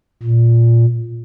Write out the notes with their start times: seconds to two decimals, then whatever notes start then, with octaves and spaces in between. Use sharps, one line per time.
0.23 A#2